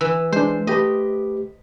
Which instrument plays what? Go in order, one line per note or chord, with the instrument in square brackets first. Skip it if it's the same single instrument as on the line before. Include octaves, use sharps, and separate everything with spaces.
[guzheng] E3 [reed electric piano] E6
[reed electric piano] G#3 D4 [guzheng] C5
[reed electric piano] A3 G4 B4 [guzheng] D#5